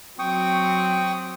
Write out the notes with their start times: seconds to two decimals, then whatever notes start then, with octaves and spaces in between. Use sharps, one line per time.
0.19 F#3 C4 G5 C#6 D#6